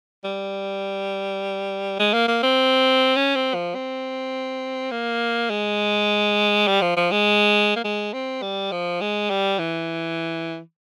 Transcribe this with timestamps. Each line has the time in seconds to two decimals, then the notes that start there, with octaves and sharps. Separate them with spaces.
0.24 G3
2.00 G#3
2.14 A#3
2.28 A#3
2.43 C4
3.16 C#4
3.35 C4
3.54 F3
3.75 C4
4.91 A#3
5.50 G#3
6.67 G3
6.82 F3
6.97 F3
7.11 G#3
7.76 A#3
7.84 G#3
8.13 C4
8.42 G3
8.72 F3
9.01 G#3
9.30 G3
9.59 E3